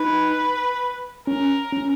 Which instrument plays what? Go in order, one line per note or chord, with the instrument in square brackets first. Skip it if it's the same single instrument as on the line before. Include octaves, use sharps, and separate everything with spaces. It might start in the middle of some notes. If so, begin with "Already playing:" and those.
Already playing: [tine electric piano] D#4 [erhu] B4
[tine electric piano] C#4 [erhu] A#4
[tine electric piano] C#4